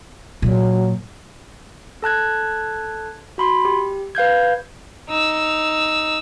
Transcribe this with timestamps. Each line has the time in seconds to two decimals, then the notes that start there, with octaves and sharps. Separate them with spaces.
0.42 A#2 F#3
2.02 A4 A5 F#6 G#6
3.38 F#4 B5 C6
3.65 G4
4.15 B4 F5 G6 G#6
5.09 D#4 E6